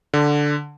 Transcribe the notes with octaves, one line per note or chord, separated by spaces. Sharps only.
D3